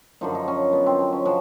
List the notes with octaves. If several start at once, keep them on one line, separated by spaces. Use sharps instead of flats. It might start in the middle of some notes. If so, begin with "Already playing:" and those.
F#2 D3 F3 D#4
D#4
C#4
B3
C4
C4
C#4
C#3 F3 F#4